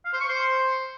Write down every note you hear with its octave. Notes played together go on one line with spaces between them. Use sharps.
F5
C5
C#6
C5